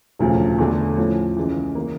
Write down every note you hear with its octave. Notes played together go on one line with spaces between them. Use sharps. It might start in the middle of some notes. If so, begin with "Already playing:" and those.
E1 D2 C#3 F3
E2 D3 A3
A2 F3 C#4 E4
C#2 C#3 E3
C#3 E3 A#3